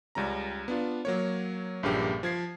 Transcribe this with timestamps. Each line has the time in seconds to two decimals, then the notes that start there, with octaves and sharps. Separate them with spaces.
0.15 C#2 G3 C#4 A#5
0.68 B3 D4 F4
1.05 F#3 A#3 C#5
1.83 A#1 G2 C#3 A#3 G4
2.23 F3 G#6 C7